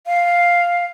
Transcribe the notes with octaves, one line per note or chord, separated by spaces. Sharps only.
F5